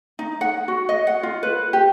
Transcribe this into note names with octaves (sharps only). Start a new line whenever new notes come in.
D#4
F#5
F#4
D#5
F#5
F4
B4
G4